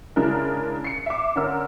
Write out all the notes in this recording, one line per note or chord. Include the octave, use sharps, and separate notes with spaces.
C#3 G#3 D4 E4 A#4
C7 C#7
E5 D6
D3 C#4 A#4 E6